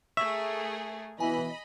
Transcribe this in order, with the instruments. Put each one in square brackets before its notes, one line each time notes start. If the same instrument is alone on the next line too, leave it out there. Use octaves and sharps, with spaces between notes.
[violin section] A3 G#4 A#4 [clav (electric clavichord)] E5 [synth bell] C#6
[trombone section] B2 E3 [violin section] D#5 B5 [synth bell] G#5